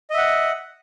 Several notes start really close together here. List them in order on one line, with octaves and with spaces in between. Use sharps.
D#5 E5 F#5